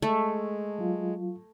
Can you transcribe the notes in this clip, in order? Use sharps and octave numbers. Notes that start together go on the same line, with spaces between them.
G#3 A3
F#3 F4